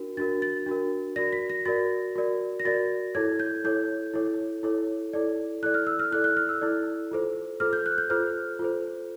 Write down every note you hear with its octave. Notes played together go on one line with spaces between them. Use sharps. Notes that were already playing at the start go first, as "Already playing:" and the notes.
Already playing: D4 F#4 A#4
D4 F#4 A#4 A6
A6
D4 F#4 A#4
F#4 A#4 D5 A#6
B6
A#6
F#4 A#4 D5 A6
F#4 A#4 D5
A#6
F#4 A#4 D5 A6
E4 A4 C#5 G#6
G6
E4 A4 C#5 G6
E4 A4 C#5
E4 A4 C#5
E4 A4 D5
E4 A4 D5 F#6
F6
E6
F6
E4 A4 D5 F#6
F#6
F6
E6
E4 A4 D5
F4 A4 C5
F4 A4 C5 F6
G6
F#6
G6
F4 A4 C5 F6
F4 A4 C5